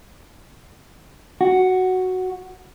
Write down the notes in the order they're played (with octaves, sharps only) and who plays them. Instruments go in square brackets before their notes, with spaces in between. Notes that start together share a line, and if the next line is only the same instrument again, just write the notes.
[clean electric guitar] F#4